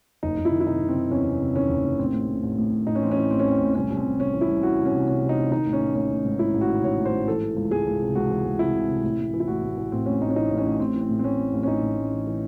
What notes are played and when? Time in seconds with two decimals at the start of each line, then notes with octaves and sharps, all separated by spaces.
0.23 F#1 D#4
0.38 F#1
0.45 E4
0.52 D#3
0.60 E4
0.66 C3 D#4
0.82 D#3
0.88 C4
0.96 D#3
1.11 E2 C#4
1.25 C3
1.41 C3
1.56 D#3 C#4
1.70 F#1
1.84 D#3
1.99 A1 C4
2.13 A1
2.28 A2
2.43 A1
2.58 A2
2.73 A1
2.87 A2 D#4
2.95 C#4
3.02 E3 C4
3.11 C#4
3.17 E3
3.31 A1 C4
3.40 C#4
3.46 E3 C4
3.61 A1
3.75 C2 C#4
3.90 C2
3.97 C4
4.04 C2
4.19 C2 C#4
4.33 E3
4.41 E4
4.48 C2
4.63 E3 F#4
4.78 C2
4.86 C#4
4.92 C3
5.07 C3 C#4
5.22 C3
5.29 D#4
5.37 C3
5.51 D#3 D#4
5.66 A1
5.73 C#4
5.80 A1
5.95 A1 C#4
6.10 A1
6.25 G#2
6.39 G#2 E4
6.54 A1
6.61 F#4
6.69 D#3
6.83 D#3 C#5
6.98 A1
7.05 C5
7.13 G#2
7.27 E3 A4
7.43 E3
7.56 C#2
7.71 C#2 G#4
7.87 C#2
8.01 C3
8.15 C#2 F#4
8.30 E3
8.44 C#2
8.59 C3 E4
8.74 C3
8.89 C3
9.04 A1
9.19 A1
9.34 E3
9.40 E4
9.48 A1 F#4
9.62 A1
9.77 E3
9.92 A2 C4
10.06 A1 C#4
10.21 A1 D#4
10.30 C#4
10.36 E3 D#4
10.50 A1
10.58 C#4
10.65 A1
10.80 A1 C4
10.94 E3
11.01 C4
11.09 A2
11.19 C4
11.23 A2 C#4
11.38 A1
11.53 A1
11.63 C#4
11.68 A1 D#4
11.82 A1
11.97 A2
12.12 E3
12.27 E3